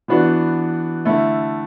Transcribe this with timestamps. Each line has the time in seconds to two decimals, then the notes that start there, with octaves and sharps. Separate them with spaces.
0.08 E3 B3 D4 F#4
1.05 D3 A3 E4